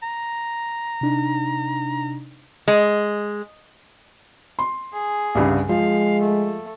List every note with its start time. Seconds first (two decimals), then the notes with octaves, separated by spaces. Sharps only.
0.02 A#5
1.01 C3 D4 D#4
2.68 G#3
4.59 C6
4.93 G#4
5.35 C2 G2 C#3
5.69 F3 G#3 F5
6.22 A3